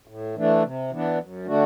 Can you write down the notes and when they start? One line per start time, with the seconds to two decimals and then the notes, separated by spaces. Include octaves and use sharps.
0.07 A2
0.35 E3 A3 D4
0.63 C3
0.91 E3 B3 D4
1.19 F#2
1.47 D3 A3 D4 F#4